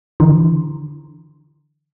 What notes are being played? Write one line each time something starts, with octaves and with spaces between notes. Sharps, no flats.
D3 E3